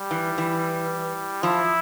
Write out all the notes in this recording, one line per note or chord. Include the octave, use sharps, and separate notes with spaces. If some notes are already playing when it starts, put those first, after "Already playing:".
Already playing: G3
E3
E3
F3 E4